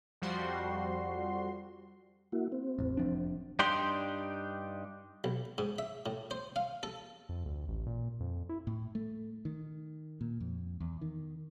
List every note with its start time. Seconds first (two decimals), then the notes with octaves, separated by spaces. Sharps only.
0.22 F2 F3 G3 F#4 C6
2.32 A#3 E4 F#4
2.52 C4
2.79 A1 E2
2.97 F1 F3 D4
3.59 G2 D4 D#4 G4 D5 C6
5.24 B1
5.58 G#2
5.78 E5
6.06 A2
6.31 C5
6.56 F5
6.83 A4
7.29 F2
7.46 D2
7.68 A1
7.86 A#2
8.20 F2
8.49 E4
8.67 A2
8.95 A3
9.45 D#3
10.21 A#2
10.40 F2
10.80 E2
11.01 D#3